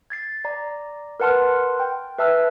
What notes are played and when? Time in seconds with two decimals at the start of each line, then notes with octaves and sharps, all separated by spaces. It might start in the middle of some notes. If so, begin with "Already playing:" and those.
0.10 G#6 A6 C7
0.45 D5 A#5
1.20 A#4 B4 F#5 A5 C6 F6
1.80 G5
2.18 B4 E5 A5 E6 F6